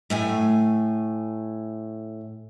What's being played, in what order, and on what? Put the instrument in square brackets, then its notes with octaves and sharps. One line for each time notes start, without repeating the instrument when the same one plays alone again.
[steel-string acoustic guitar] A2 A3 G#5